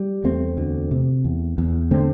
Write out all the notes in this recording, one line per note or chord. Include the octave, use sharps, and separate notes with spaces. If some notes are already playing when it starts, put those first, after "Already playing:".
Already playing: G3
E2 A3 C4
D2
C3
E2
E2
D3 A3 C4